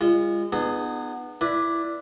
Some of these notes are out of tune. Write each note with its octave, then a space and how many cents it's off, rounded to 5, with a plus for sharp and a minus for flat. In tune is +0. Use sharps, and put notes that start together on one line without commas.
G#3 -35 F4 -30
B3 +0 D#4 -40 G#4 +0
E4 +15 B4 -15 D5 +0